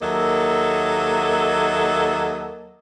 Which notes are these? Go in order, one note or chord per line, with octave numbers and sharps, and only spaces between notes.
D#2 F#3 A#3 A4 D#5 E5